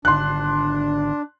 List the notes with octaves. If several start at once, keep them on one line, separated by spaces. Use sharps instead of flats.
G#1 D3 D4 C6 F#6